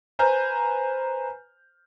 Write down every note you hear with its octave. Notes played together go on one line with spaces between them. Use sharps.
B4 C5 G#5 A#5 F6 G6